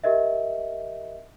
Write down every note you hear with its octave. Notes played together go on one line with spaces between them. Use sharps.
G4 A#4 D#5 E5